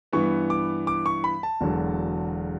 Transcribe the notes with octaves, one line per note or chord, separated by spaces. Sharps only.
G2 E3 B3 C#6
D6
D6
C#6
B5
A5
E1 E2 D3 F#3